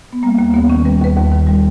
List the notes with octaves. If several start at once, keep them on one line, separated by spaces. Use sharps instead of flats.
B3
G3 A#3
D#2 A#3
D#2 B3
D#3 C#4
G3 B4
D#2 B4
D#2
D#3
G3